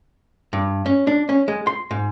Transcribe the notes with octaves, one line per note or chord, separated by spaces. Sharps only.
G2
C#4
D4
C#4
G#3
C6
G#2